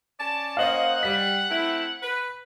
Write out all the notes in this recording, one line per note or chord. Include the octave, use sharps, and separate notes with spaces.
C#4 D5 A5
A#3 C#4 C5 D#5 F5 F#5
G3 B6
A3 C4 E4
B4